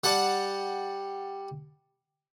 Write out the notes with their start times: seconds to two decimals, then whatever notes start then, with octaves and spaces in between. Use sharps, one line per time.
0.04 G3 F#5 A5